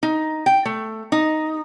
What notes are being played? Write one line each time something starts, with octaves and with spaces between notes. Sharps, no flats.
D#4
G5
A3
D#4